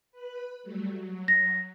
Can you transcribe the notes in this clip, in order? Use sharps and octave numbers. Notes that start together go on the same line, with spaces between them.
B4 B5
F#3 G3 A3
F#3
A#6